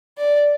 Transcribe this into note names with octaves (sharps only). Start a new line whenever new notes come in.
D5